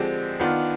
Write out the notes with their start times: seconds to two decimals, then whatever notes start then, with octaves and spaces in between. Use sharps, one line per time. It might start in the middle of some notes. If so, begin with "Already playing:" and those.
Already playing: D3 F3 G#3 C4 G4
0.39 D#3 B3 D4 F4